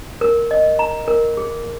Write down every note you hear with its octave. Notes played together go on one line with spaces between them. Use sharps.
A#4
D#5
A#5
A#4
G#4